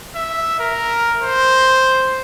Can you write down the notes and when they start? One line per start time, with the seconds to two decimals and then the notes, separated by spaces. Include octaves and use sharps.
0.16 E5
0.60 A#4
1.23 C5